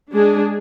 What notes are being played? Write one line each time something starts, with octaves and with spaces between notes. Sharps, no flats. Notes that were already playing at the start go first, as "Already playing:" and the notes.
G#3 D4 G#4